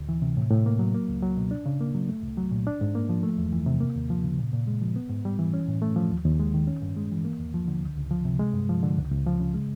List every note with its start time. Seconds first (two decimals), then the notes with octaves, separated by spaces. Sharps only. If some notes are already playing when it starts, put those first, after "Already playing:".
Already playing: D2
0.09 E3
0.22 C3
0.37 A2
0.51 A2
0.66 A#3
0.79 F#3
0.95 A#3
1.09 C#2
1.22 F#3
1.37 B2
1.51 D4
1.66 C#3
1.81 A#3
1.95 F#3
2.09 A3
2.23 C2
2.37 F#3
2.51 A#2
2.67 D4
2.81 G#2
2.95 A#3
3.09 F3
3.23 A3
3.38 E2
3.53 E3
3.66 C3
3.80 A#3
3.95 D#2
4.10 F3
4.24 C#3
4.38 A#2
4.53 A#2
4.67 G#3
4.82 F3
4.96 B3
5.10 G#2
5.25 G3
5.39 E3
5.54 C#4
5.68 A2
5.82 A3
5.96 F3
6.11 D#2
6.25 D#2
6.40 G#3
6.54 D#3
6.67 C#4
6.82 G2
6.97 G#3
7.12 E3
7.25 A#3
7.40 D#2
7.54 F3
7.68 D3
7.83 C#2
7.97 C#2
8.11 F3
8.25 C3
8.39 G#3
8.54 G2
8.69 F3
8.82 D3
8.98 C#2
9.12 C#2
9.27 F3
9.40 C#3
9.54 G#3